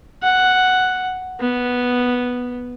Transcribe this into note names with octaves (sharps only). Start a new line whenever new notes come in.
F#5
B3